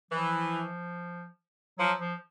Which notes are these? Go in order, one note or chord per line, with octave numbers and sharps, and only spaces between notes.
E3 F3
F3 F#3
F3